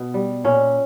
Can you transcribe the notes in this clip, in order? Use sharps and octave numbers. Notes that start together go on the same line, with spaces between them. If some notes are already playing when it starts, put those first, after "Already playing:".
Already playing: B2 B3
G3
A#2 C#4